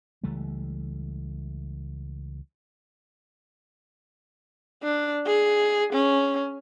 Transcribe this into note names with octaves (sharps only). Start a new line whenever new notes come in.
C#2 E3 G3 A3
D4
G#4
C#4